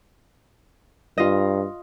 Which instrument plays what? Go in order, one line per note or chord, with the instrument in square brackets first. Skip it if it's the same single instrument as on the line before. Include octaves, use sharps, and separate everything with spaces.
[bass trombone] G2 [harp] F4 D#5